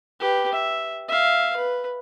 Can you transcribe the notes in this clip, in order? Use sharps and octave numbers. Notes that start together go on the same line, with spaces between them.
G4 B4
E5
E5 F5
B4